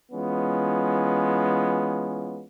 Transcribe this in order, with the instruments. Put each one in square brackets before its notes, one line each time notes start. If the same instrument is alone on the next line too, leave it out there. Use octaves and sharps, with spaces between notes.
[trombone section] E3 G#3 B3 C#4 F4